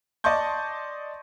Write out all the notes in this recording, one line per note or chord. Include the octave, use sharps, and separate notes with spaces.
D5 D#5 A5 C6 C#6 G6